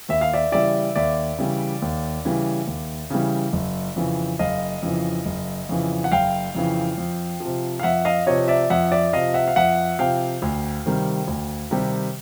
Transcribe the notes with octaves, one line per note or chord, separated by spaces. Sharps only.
D#2 E5
F5
D5 E5
C#3 E3 G3 D5 E5
D#2 D5 E5
C#3 E3 G3
D#2
C#3 E3 G3
D#2
C#3 E3 G3
F#1
F2 C#3 E3
F#1 D#5 F5
F2 C#3 E3
F#1
F2 C#3 E3
F#5
F#1 F5 G5
F2 C#3 E3
F2
C3 F3
F5
F2 E5 F#5
D#5 F5
C3 F3 C#5 D#5
D5 E5
F2 E5 F#5
D5 E5
C3 F3 D#5 F5
E5 F#5
F5
F2 E5 F#5
C3 F3 F5 G5
D2
C3 D#3 G3
D2
C3 D#3 G3